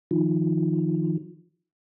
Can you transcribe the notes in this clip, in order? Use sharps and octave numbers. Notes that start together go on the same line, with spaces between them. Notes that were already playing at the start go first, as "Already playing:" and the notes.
D#3 F3